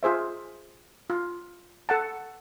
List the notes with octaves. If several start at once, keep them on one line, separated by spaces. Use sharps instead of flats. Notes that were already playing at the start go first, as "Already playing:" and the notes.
F4 G#4 C5 E5
F4
A4 F#5 A5